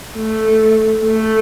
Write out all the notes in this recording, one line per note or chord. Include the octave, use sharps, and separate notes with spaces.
A3
A3